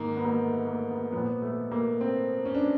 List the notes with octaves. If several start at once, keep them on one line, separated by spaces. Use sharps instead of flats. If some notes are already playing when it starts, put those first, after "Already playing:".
Already playing: G#2 D#3 A#3
B3
A#3
A3
A#3
B3
A#2 F3 B3
A3
A#3
C4
C#4
D4